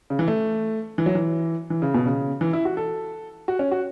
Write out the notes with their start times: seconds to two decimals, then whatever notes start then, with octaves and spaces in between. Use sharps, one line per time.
0.10 C#3
0.19 E3
0.28 A3
0.98 E3
1.06 F#3
1.15 E3
1.70 E3
1.82 C#3
1.94 B2
2.06 C#3
2.41 E3
2.53 E4
2.65 F#4
2.77 A4
3.48 F#4
3.59 C#4
3.72 F#4